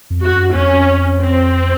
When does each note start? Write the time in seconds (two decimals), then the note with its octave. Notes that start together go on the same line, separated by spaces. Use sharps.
0.10 F2
0.21 F#4
0.32 F#2
0.54 F2 C#4
1.21 C4